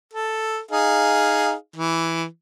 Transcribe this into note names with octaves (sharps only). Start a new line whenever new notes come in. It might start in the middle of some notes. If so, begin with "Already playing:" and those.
A4
D#4 G#4 F5
E3